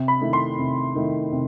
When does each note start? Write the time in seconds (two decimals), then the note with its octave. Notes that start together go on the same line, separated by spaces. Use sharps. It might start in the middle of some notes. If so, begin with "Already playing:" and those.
Already playing: C3
0.08 B5
0.21 D#3 A3 E4
0.33 C6
0.59 C3
0.95 D#3 A3 E4
1.32 C3